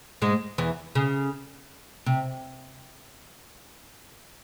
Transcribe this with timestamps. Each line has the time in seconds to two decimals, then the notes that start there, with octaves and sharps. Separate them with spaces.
0.22 G#2 G#3
0.58 E2 E3
0.95 C#3
2.06 C3